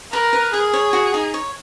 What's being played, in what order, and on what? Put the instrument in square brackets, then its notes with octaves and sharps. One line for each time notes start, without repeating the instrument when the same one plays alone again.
[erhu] A#4 [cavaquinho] B4
[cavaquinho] B4
[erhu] G#4 [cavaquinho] A#4
[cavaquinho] C#5
F#4
D#4
C#5